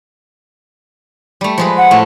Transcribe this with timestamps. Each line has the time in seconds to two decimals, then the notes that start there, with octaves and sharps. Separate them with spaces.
1.41 G3 A3
1.58 F3 G#3 B4
1.78 F#5
1.91 A2 A3